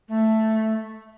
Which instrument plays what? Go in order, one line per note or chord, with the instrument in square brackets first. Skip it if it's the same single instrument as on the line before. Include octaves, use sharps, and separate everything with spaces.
[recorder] A3